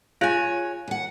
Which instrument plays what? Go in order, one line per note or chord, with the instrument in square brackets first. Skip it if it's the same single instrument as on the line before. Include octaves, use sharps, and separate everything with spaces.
[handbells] F4 G#4 [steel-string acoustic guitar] C#5 G#5 [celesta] F5 F#6
[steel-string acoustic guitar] D#2 F#5